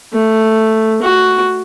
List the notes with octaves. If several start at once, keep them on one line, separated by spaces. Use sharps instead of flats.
A3
F#4